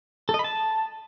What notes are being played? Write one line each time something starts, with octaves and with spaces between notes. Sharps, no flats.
A4
D#5
B5
A5